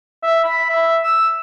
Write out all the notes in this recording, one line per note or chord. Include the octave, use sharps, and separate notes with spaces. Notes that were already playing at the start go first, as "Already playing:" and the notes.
E5
B5
E5
E6